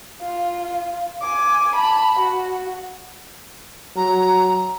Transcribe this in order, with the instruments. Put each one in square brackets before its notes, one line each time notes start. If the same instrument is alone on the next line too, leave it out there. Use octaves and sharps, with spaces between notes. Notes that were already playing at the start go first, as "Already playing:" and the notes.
[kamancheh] F4
G#5 D6
A5 B5
F#4
[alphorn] F#3 [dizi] A#5